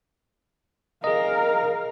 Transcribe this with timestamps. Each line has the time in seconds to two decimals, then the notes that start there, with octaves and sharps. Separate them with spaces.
1.04 G#4 A#4 D#5 F5